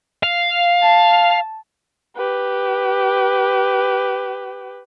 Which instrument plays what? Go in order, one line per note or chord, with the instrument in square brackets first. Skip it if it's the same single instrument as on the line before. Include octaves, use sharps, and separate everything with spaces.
[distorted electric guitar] F5
[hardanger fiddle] A5
[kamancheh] G4 B4